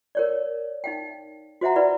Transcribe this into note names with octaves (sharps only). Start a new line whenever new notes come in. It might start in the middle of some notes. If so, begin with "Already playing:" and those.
A#4 C#5 D5
D#4 F5 G5
F#4 C5 E5 F#5 A#5
E4 B4 D5 B5